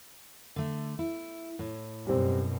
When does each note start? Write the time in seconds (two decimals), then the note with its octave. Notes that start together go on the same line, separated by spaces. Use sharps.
0.56 D3 A3
0.99 E4
1.59 A2
2.07 F#2 B2 G3 C4